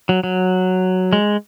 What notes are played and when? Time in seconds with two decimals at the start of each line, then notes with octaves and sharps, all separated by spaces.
0.09 F#3
0.24 F#3
1.13 G#3